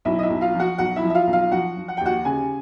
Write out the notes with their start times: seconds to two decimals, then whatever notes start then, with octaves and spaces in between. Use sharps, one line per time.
0.05 B1 E4 E5
0.19 D#5
0.23 E4 E5
0.30 B1
0.41 F4 F5
0.54 F3
0.60 F#4 F#5
0.78 B1 F#4 F#5
0.96 E4 E5
1.03 F3
1.10 E5
1.15 F4 F5
1.27 B1
1.33 F4 F5
1.52 F3 F#4 F#5
1.77 F3
1.88 F#5
1.97 D#2 G5
2.05 F#4 F#5
2.25 C#3 G#4 G#5